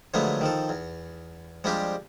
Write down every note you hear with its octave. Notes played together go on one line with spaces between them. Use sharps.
D3 F3 F#3 G#3 A3 B3
D#3 F3 A4
E2
F3 G3 G#3 C4 D4 G4